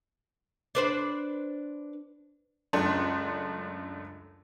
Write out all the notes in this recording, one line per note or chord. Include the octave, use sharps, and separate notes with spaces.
D4 B4 C5
C#2 F#2 A3 D4 C6